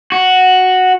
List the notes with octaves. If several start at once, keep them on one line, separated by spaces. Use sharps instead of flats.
F#4